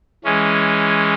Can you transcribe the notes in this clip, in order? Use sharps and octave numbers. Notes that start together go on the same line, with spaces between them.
E3 G#3 C#4